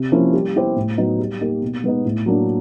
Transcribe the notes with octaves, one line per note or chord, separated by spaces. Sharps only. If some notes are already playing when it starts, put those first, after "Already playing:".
Already playing: C3
F3 A#3 C#4 E4
G3
B3 E4 G4 C5
A2
F#3 B3 D#4
G3
A#3 D#4 G4
B2
G#3 B3 D#4
A2
F#3 A#3 D4